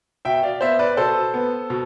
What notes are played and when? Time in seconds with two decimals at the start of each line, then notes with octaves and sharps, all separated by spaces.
0.25 B2 E5 G5
0.43 D5 F5
0.61 B3 C5 E5
0.79 B4 D5
0.97 B2 A4 C5
1.34 B3
1.70 B2